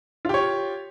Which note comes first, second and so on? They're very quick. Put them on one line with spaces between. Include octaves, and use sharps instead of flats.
F4 G4 C#5